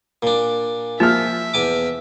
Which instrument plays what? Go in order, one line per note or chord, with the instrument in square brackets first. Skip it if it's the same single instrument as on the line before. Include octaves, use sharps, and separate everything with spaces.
[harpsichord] A#2 D4
[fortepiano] F3 F6 [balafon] A#3 [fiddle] E5
[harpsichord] E2 G#5 D6